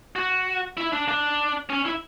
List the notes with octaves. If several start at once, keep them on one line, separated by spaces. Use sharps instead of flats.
F#4
E4
D4
D4
C#4
E4